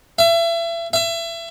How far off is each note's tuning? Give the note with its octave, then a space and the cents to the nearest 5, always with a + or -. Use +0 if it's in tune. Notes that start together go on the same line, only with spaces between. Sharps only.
E5 +35
E5 +30